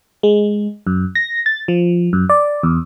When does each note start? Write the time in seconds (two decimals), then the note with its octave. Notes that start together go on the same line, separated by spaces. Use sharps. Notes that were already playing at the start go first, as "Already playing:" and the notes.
0.23 G#3
0.87 F#2
1.15 A#6
1.46 A6
1.68 F3
2.13 F#2
2.29 D5
2.63 E2